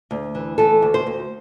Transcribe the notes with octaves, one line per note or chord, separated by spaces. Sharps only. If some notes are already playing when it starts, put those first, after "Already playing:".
D2
E3
E3 A4
D2
C5
D2